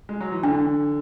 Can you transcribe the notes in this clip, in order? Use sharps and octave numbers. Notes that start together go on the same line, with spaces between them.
G#3
F#3
E3
D3 D4